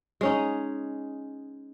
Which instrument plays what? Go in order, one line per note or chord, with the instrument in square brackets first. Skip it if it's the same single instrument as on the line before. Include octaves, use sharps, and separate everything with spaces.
[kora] G#3 C#4 D#4